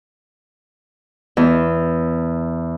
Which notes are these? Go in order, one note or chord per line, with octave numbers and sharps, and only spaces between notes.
E2